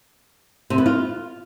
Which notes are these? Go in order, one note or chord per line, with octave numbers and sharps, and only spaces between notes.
C3
B3
F4